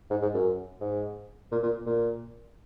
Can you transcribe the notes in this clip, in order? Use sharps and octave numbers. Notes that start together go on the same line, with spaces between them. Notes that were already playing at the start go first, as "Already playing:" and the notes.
G#2
G#2
F#2
G#2
A#2
A#2
A#2